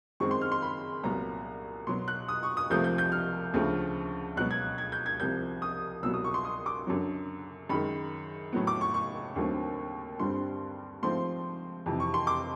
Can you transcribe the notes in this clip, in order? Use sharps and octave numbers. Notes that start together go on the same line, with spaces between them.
F#2 D#3 G#3 C4 C#6
C6
F6
C6
B5
C2 A#2 F#3 B3 A#5
B2 F#3 B3 C6
F#6
D#6
C#6
D#6
C2 C3 F3 A3 G6
G6
G6
F6
D2 C#3 F3 A3
C#2 B2 F#3 B3 F#6
G#6
G#6
G6
G#6
C2 C3 F3 G6
D#6
C2 B2 F#3 B3 E6
D#6
C#6
C6
D#6
D6
F#2 D3 F#3
F#2 D#3 G#3 B5
A2 F#3 B3
D6
C#6
C#6
D#2 D3 F#3 A3 C4
G2 D3 G3 C4 C6
G#2 F3 A3 C4 C6
F2 C3 E3
C#6
C6
D6